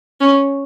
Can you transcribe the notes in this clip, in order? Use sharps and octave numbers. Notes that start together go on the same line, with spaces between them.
C#4